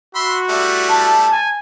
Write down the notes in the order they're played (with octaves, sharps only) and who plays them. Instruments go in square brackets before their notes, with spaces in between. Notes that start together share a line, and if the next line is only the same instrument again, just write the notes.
[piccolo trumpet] F#4 [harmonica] E5 B5 C6
[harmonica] G3 A3 E4
[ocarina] A5
[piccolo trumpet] G#5